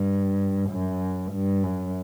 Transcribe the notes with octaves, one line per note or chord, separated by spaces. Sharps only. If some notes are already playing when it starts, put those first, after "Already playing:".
Already playing: G2
F#2
G2
F#2